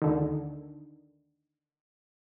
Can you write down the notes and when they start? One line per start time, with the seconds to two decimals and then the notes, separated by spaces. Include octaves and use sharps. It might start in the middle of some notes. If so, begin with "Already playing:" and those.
0.02 D2 D3 D#3